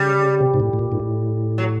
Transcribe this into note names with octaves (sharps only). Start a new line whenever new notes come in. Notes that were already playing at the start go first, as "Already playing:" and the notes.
Already playing: C#3 G3
C3
G#2
A2
A2
A#2
G#2
A2
F#3